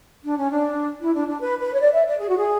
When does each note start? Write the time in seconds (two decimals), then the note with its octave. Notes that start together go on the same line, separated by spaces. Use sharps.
0.23 D4
0.37 C#4
0.50 D4
1.02 E4
1.15 D4
1.28 D4
1.41 B4
1.61 B4
1.74 C#5
1.80 D5
1.93 E5
2.06 D5
2.19 G#4
2.29 F#4
2.37 G#4